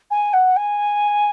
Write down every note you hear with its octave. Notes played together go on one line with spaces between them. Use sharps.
G#5
F#5
G#5